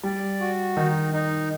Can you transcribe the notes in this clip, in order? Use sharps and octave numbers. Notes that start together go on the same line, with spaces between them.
G3 D5
F#4
D#3 D#4
D#4